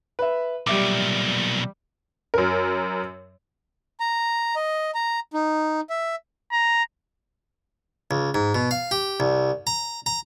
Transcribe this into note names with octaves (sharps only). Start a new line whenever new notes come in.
B4 E5
B1 A#2 G3 E5 D6
F#2 A#4
A#5
D#5
A#5
D#4
E5
A#5
C#2
G#2
B2
F5
G4
C2
A#5
A#5